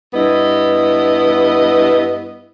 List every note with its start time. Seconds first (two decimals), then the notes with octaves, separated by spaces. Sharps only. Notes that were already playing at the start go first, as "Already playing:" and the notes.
0.14 G2 B3 E4 D#5